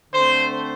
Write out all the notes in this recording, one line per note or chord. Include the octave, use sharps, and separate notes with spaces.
D3 A3 C4 C5